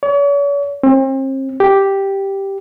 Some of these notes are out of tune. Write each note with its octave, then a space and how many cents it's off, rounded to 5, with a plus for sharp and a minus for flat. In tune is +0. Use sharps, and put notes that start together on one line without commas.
C#5 +45
C4 +40
G4 +0